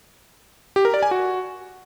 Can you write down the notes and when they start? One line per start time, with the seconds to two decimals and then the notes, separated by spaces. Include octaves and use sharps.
0.76 G4
0.85 A#4
0.94 D5
1.03 G#5
1.11 F#4